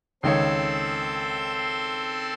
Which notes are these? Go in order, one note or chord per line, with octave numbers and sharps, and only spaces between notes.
C#2 D#3 C4 A4 C#5 C6